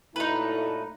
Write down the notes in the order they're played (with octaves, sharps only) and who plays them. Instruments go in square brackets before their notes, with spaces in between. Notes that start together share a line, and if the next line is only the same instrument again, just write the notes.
[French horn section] F#2 A#2 A3 [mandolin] D#4 B4 [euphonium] E4